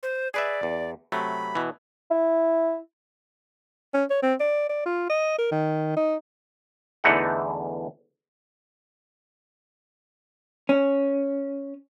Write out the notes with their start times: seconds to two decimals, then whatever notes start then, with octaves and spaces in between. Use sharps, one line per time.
0.03 C5
0.34 G#4 B4 D5 E5
0.63 E2
1.12 C3 F#3 A3 B5
1.55 B2 E3
2.11 E4
3.94 C#4
4.10 C#5
4.23 C4
4.40 D5
4.69 D5
4.86 F4
5.09 D#5
5.38 A#4
5.52 D#3
5.97 D#4
7.04 E2 D3 E3 A3 D#4 F#5
10.69 C#4